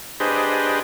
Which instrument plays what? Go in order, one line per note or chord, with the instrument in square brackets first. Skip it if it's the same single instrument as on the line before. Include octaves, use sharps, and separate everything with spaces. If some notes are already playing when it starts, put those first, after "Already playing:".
[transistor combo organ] D4 G4 G#4 B4 C5 D#5